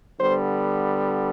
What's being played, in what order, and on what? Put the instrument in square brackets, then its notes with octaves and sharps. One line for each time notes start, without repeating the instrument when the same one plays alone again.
[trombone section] D3 G3 B3 C5